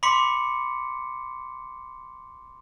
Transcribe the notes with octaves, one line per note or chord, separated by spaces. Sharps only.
B5 C6 D6 B6 C#7